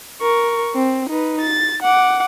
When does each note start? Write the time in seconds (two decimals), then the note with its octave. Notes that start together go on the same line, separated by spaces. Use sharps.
0.21 A#4 C#6
0.75 C4
1.10 D#4 B4
1.41 A6
1.82 F#5 D6